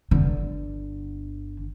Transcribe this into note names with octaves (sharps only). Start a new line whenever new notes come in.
G1 D3